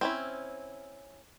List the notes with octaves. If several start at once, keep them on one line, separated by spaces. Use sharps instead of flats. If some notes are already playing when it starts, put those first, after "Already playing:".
C4 C#4 E4